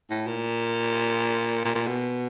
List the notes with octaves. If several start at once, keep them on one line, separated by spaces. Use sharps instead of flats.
A2
A#2
A#2
A#2
B2